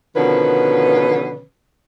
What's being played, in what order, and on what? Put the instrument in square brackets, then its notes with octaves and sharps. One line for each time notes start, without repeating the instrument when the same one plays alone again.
[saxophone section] B2 D3 D#3 F3 C#4 B4